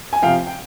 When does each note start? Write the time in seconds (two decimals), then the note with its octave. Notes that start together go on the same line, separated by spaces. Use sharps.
0.13 G#5
0.22 C3 F3 F5 G5
0.47 G5